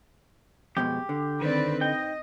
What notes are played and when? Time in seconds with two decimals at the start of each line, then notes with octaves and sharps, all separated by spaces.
0.77 F2 B2 G#3 G4
1.09 D3
1.41 D#3 C4 B4 D5
1.81 D#4 D#5 G5